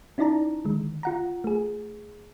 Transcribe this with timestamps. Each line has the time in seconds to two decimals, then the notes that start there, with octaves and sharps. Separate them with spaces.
0.18 C#4 D#4 E4 D5 A5 A#5
0.65 D3 D#3 G#3
1.03 F4 F#5 A#5
1.44 A3 G#4